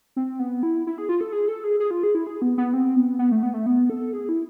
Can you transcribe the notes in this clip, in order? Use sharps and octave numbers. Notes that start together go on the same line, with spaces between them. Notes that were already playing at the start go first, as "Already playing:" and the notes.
C4
B3
E4
E4
G#4
F4
A4
G#4
A4
G#4
G#4
F4
G#4
E4
G#4
B3
B3
C4
B3
B3
A3
B3
A3
B3
A4
G#4
E4